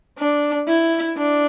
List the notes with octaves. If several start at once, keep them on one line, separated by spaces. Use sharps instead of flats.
D4
E4
D4